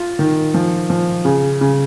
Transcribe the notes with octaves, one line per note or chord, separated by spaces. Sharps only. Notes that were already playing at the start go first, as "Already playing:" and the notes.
Already playing: F4
D#3
F3
F3
C#3
C#3